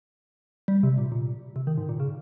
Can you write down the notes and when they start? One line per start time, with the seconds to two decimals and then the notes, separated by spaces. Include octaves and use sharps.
0.68 G3
0.83 C3
0.98 A#2
1.12 A#2
1.56 C3
1.67 D#3
1.77 G#2
1.89 A#2
2.00 C#3